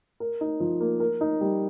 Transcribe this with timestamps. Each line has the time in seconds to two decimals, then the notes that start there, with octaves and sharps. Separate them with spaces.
0.20 A#4
0.41 D#4
0.60 F3
0.80 A#3
1.00 A#4
1.21 D#4
1.41 G3